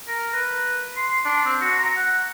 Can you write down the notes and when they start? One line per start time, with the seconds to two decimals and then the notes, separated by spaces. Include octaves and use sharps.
0.08 A#4
0.33 B4
0.96 C6
1.25 D4
1.46 C4
1.61 F#4
1.79 A#5
1.96 F#5